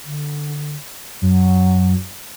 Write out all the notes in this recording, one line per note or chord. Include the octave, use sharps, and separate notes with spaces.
D3
F#2 F#3